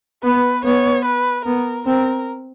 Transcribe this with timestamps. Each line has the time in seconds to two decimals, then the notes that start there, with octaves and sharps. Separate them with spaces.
0.24 B3 B4
0.64 B3 C#5
1.05 B4
1.45 B3 A#4
1.86 C4 A#4